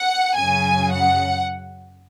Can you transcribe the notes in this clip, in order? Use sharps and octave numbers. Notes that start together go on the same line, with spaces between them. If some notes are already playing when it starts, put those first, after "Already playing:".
Already playing: F#5
F#2 C#3 F#3 G#5
F#5